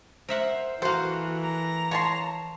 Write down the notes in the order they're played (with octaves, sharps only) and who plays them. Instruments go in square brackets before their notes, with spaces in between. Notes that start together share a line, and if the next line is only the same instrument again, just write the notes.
[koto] A#4 E5 F#5 [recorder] C5
[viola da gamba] E3 [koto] A#3 A4 [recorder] F#4 [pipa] C5
[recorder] A#5
[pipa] F3 A5 C6 [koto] C#5